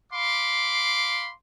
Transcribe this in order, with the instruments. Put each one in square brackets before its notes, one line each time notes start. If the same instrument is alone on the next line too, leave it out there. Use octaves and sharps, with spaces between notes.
[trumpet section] F5 B5 C6 D6